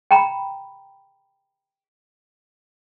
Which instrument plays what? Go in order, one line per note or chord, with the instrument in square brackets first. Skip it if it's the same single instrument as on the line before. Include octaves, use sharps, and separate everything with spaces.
[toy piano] G5 A#5 B5